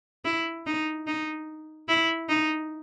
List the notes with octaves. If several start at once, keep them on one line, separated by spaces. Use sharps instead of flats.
E4
D#4
D#4
E4
D#4